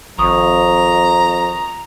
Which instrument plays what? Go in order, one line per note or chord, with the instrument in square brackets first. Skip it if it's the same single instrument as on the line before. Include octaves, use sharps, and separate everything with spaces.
[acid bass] G#1 [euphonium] F2 [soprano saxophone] A#5 [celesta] C#6 D#6